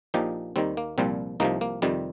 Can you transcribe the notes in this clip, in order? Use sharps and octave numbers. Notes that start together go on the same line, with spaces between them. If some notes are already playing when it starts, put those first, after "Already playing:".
A#1 A#2 F3 D#4 G4
D#2 D#3 G3 C4
A#3
C2 A#2 F3 G3 C4
C2 C3 F3 A#3 D#4
A#3
F2 C3 D#3 G3